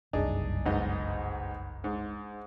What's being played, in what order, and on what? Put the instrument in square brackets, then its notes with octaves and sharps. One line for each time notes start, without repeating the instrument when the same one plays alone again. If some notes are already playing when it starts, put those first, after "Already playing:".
[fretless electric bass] F#1 C2 G2 [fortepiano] D4 D#4 G#4
[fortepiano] B1 G#2 D#5
G#2